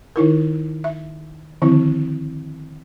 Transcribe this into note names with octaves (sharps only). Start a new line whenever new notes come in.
D#3 D#4 E4 A#4
E5
D3 D#3 F3 C4 E4